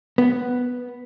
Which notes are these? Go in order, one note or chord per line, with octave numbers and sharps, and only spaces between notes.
B3